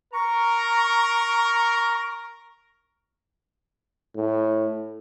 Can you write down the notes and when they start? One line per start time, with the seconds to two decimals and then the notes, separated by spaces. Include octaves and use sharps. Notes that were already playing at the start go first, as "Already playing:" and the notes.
0.14 A#4 A#5 C#6
4.16 A2